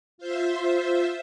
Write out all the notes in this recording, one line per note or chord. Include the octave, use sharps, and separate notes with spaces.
F4 C5 E5